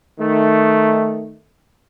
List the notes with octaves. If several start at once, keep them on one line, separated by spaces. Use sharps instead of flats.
D#3 A3